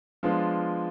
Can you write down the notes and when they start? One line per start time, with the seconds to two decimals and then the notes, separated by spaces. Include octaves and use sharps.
0.23 F3 G#3 B3 D4 F4